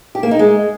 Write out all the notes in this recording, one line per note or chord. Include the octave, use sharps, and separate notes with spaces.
G4
A#3
D#4
G#3